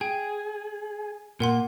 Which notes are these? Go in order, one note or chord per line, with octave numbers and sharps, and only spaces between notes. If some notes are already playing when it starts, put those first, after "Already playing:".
G#4 G5
A#2 A#4 F#5 C6